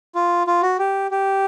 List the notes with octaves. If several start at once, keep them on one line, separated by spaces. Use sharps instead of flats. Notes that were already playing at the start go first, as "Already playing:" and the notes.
F4
F4
F#4
G4
G4